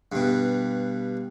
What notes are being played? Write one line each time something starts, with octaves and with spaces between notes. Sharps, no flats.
G2 B2